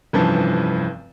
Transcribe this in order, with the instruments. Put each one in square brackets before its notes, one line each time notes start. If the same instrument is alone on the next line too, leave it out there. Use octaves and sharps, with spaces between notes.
[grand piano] F1 G2 E3 F3 C#4 A5